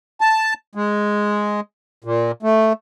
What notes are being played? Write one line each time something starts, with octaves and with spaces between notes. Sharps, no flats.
A5
G#3
A#2
A3